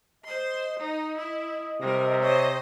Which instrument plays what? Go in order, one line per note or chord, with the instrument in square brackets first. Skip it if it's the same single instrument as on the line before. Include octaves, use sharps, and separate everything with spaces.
[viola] C5 C6 [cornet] D#5
[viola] D#4
E4
[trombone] C3 [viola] G3 A#4
[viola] C5 D#5 [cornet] C#5